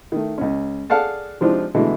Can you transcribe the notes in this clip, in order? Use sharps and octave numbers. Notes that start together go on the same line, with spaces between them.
D#3 A3
C#2 C#4
G#4 A4 D5 F5 F#5 A5
C3 F3 G#3 D4 D#4 F4
B2 D3 E3 G#3 A3